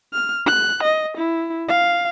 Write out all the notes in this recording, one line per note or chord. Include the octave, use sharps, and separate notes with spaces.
F6
F#6
D#5
E4
F5